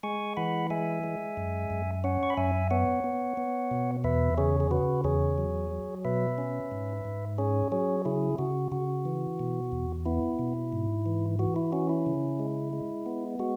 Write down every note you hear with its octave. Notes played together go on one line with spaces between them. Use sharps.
G#3 G#5 C#6
E3 F#5 B5
G#3 E5 G#5
G#3
F#2
F#2
C#4 C#5 F#5
C#6
B5
F#2 E5 G#5
B3 C#5 F#5
B3
B3
B2
E2 B4 E5
C#3 G#4 C#5
G#4
C#3 F#4 B4
E2 G#4 C#5
F#3
F#3
B2 B4 E5
C#4
G#2
G#2
C#4 G#4 C#5
F#3 G#4 C#5
C#3 E4 G#4
C#3 F#4
C#3 F#4
E3
B2
E2
B3 E4
B2
G#2
E3
E3 F#4
E4
C#4 F#4
E4
C#3
G#3
G#3
B3
G#3 F#4